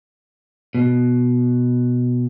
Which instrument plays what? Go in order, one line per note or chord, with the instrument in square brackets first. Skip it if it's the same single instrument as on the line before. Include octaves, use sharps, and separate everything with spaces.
[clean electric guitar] B2